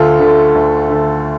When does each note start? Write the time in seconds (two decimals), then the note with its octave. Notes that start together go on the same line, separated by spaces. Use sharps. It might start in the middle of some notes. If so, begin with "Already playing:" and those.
Already playing: D2 F4 A4
0.20 D3 A3
0.55 D2
0.89 D3 A3